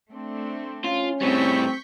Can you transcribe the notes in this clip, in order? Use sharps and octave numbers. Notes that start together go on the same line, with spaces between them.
A3 C4 D4
C#4 F4
A2 G3 C4 C#6 G6 B6